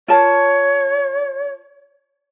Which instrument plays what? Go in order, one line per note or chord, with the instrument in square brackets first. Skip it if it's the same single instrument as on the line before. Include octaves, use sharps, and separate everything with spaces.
[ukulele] F4 A#4 A5 [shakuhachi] C#5